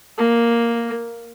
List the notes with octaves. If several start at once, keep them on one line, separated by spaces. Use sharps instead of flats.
A#3